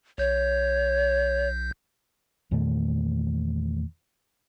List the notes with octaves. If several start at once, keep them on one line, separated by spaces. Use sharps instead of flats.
B1 C#5 G6
E2 A#2 D#3 A3